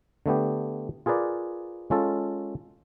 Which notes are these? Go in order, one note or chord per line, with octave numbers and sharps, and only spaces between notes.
D3 A3 B3 G4
F4 G#4 A#4 B4 D5
G#3 C#4 F4 A4